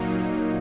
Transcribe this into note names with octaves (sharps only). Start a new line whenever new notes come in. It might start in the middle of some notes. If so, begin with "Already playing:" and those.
Already playing: A#2 F#3 A#3 D#4